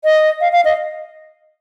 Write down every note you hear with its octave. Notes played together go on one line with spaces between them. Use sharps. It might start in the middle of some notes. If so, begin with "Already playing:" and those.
D#5
F5
F5
D#5